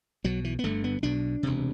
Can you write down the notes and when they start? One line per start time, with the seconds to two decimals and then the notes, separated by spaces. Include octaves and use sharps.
0.24 B1 B2 F#3
0.44 E3
0.59 B3
0.64 G1 G2 D3 A3
0.84 B3
1.03 B1 B2 D4
1.43 E1 D2 C3